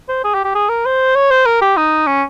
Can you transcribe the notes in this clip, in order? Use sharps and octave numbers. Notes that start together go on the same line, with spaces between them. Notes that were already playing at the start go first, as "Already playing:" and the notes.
C5
G#4
G4
G4
G#4
A#4
C5
C#5
C5
A#4
G4
D#4
C#4